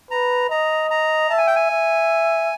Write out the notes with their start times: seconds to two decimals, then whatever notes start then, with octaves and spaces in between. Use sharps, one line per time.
0.11 B4 A#5
0.50 D#5 A#5
0.91 A#5
1.30 E5 A5
1.38 G#5
1.47 G5
1.56 G#5
1.70 E5